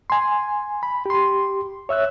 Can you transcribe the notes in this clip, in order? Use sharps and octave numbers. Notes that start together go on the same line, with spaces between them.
G#5 C6
B5
G4 C6
C#5 E5 E6 F#6